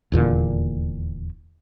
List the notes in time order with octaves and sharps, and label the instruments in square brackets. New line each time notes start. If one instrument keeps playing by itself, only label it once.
[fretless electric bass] D#1 E2 A#2 D3